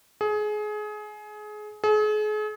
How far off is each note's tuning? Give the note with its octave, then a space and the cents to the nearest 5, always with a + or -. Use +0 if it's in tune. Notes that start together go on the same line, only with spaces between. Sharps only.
G#4 +25
G#4 +40